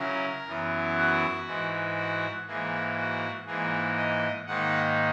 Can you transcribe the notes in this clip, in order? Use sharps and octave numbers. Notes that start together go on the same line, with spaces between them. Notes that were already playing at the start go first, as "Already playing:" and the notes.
Already playing: C#3 F#3 C#4 E4 A#4
F#2 E3 B3 E4
F#4
G#2 E3 G#3
F#4
G#2 E3 A#3 G#4
F#4
G#2 E3 A#3 G#4
D#5
G#2 D#3 A#3 D#4 F#5